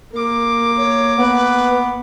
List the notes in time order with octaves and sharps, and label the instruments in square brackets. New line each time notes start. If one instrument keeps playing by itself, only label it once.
[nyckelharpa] A#3 D6 [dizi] A#4
[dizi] C#5
[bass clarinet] B3 [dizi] B4